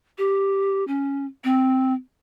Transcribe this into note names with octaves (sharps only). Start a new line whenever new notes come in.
G4
C#4
C4